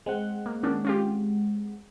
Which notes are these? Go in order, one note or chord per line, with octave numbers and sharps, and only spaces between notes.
G#3 C4 F#5
A#3
D#3 C#4 D4
C#4 F4 G4